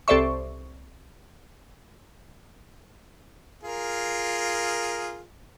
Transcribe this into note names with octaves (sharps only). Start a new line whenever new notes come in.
C2 A4 C5 D5 E5 C#6
F4 G#4 A#4